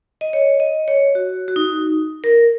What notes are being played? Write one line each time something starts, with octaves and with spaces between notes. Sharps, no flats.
D#5
C#5
D#5
C#5
F#4
F#4
D#4
A#4